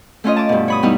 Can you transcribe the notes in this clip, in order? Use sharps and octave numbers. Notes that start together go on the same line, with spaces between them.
A3 C#4 F4 D#5
A5 D6
G2 B2
C#5 B5 D#6
G3 B3 D#4 E4